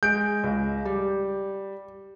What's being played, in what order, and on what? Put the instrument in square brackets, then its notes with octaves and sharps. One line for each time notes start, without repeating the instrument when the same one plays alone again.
[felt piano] G#3 D7 [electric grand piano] G6
[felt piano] C#2
G3